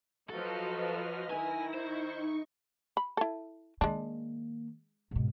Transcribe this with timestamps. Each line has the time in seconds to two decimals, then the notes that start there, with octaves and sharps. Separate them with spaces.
0.29 F3 F#3 F#4 A4 B4 D#5 F6
1.31 D#3 E4 G#5 A#6
1.74 D#4 C5 C#6
2.97 B5
3.17 E4 A4
3.81 D#3 G#3 A#3 D4
5.11 G#2 B2